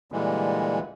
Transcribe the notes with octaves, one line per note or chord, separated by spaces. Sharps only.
A#2 D3 E3 G3 G#3